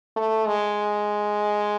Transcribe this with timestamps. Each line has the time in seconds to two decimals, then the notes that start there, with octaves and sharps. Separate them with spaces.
0.16 A3
0.47 G#3